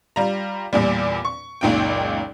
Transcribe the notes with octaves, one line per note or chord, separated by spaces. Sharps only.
G3 F4 A#5
E2 A#2 G3
C#6
F#1 C#2 A#2 D#4 F4 G5